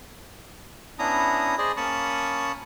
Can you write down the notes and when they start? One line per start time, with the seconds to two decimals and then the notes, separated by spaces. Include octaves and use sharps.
0.99 B3 C#4 D4 E4 A#5 D#6
1.58 G#4 C5 D5 D#5
1.77 A#3 C#4 A5 B5 C#6 D#6